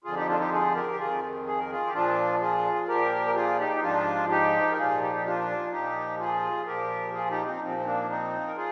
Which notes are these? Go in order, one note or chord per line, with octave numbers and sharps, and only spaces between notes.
F2 D3 F3 F4 G#4
D#4 G4
D4 F4
D#4 G4
F4 G#4
G4 A#4
G4
F2 D#3 F4 G#4
G#4
A#4
F4 G#4
G4
A#2 F3 D4 F4
F4 G#4
A#2 F3 G4 A#4
A#4
F4 G#4
D#4 G4
D#4
G#2 F3 D4 F4
D#4 G4
A#4
A#2 F3 F4 G#4
D#4 G4
G4
D4 F4
A#2 F3 D#4 G4
F4 G#4
A#2 F3 G4 A#4
F4 G#4
D#4 G4
C4 D#4
A#2 F3 C4
C4
A#3 D4
C4 D#4
A#4
F4 G#4